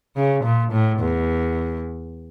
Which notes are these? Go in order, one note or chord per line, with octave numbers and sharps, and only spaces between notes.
C#3
A#2
A2
E2